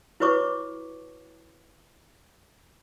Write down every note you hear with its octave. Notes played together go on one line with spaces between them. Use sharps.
E4 F#4 B4 C#5 C#6 D6